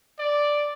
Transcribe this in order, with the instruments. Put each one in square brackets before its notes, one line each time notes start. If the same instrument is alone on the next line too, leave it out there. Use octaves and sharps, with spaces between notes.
[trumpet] D5